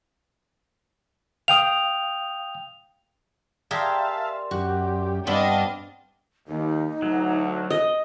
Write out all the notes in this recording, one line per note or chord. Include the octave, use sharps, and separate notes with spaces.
F5 G5 D#6 F7
G4 G#4 A#4 D5 E5 F5 A5 C6
F#2 F#4 G4
G2 B3 C4 D4 D#5 F5
D#2 D#4
D2 F#3
D#5